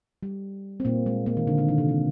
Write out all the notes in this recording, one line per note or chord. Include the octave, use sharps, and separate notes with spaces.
G3
C4
A#2 A#3
G#3
A#2 A#3
D#3
D3
D3
D#3
C3
D#3